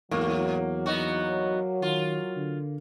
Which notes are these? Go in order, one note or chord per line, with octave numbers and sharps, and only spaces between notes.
E2 G#2 F#3 A#3
B3 D#4 F#4
D#3 F4
D3